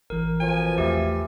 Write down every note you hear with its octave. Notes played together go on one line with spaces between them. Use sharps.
A1 E3 A#4
F2 B2 F3 G#5
E2 A3 G4 E5